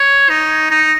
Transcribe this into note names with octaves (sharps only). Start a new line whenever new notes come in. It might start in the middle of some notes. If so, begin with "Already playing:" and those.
Already playing: C#5
D#4
D#4